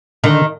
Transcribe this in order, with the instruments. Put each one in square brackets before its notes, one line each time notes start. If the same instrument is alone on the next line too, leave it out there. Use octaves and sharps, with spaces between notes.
[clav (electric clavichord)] D3 [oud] D#3